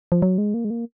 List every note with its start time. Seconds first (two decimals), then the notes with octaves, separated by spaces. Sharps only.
0.12 F3
0.22 F#3
0.38 G#3
0.54 A#3
0.65 G#3
0.70 A#3